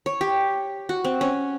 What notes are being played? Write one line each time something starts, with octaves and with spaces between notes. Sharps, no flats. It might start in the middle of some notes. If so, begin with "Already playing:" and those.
C#5
G4
F#4
C4
C#4